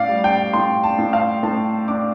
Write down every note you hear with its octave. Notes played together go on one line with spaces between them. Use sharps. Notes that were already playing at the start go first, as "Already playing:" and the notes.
Already playing: A2 D5 F5
G3
G5
A2 C6
A5
A2
F5
A2 A5
D4 D6